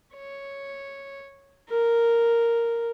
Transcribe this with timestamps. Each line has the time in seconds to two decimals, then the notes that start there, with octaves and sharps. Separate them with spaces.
0.14 C#5
1.69 A#4